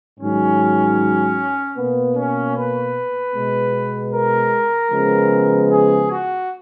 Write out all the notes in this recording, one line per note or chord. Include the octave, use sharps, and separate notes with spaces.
G#2 D#3 F#3 C#4
B2 A#3 B3
C#4
B4
B2 G#3 B3
A#4
C#3 F3 G#3 B3
G#4
F#4